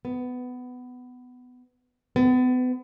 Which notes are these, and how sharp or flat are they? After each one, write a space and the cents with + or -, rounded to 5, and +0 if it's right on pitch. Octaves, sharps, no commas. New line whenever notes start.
B3 +15
B3 +35